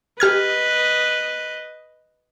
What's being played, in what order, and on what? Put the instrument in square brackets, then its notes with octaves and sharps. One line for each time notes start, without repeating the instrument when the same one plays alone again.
[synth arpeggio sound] G4 F6 G#6 [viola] B4 D#5